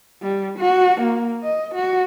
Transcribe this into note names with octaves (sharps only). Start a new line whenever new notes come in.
G3
F#4
A#3
D#5
F#4